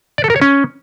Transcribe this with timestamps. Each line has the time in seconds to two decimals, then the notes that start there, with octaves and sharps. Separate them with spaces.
0.18 D5
0.24 A4
0.30 A#4
0.36 C#5
0.42 C#4